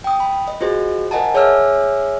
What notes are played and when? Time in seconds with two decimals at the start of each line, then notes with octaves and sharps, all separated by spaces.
0.04 G5 D#6
0.20 B5
0.48 D#5
0.61 F4 F#4 G#4 C5 D#5
1.11 A#4 C5 D#5 F#5 G#5 A5
1.34 G#4 C#5 E5 G#5 E6 F6